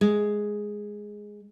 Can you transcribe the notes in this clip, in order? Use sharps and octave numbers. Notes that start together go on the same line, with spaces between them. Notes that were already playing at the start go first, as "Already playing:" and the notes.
G#3